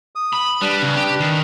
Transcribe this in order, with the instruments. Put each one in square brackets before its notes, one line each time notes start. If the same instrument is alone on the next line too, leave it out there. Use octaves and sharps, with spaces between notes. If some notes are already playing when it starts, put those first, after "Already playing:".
[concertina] D#6
[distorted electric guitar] B5
[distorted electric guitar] G3 [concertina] D4 B4
[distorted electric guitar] C#3
G4
D#3